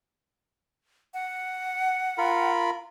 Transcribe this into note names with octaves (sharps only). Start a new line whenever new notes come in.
F#5
F4 A#4 B5